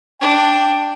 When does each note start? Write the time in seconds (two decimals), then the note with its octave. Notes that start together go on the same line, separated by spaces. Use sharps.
0.21 D4 G5